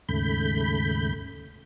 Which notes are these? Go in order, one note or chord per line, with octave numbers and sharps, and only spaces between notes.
D#2 G#2 C#3 A3 B5 G6